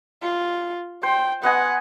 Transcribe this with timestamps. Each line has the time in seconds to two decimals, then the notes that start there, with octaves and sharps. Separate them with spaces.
0.22 F4
1.03 C5 G5
1.43 B3 D#5 F#5 G#5